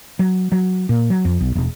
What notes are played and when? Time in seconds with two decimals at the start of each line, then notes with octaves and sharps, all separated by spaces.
0.19 F#3
0.52 F#3
0.89 A#2
1.10 F#3
1.25 F2
1.40 B1
1.55 E1